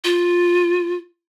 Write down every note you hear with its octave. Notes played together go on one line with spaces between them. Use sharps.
F4